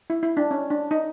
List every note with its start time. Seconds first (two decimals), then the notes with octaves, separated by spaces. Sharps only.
0.10 E4
0.23 E4
0.37 D4
0.51 C#4
0.70 D4
0.91 D#4